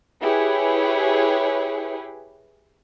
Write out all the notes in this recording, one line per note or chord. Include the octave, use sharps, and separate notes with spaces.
E4 G4 G#4 B4 C#5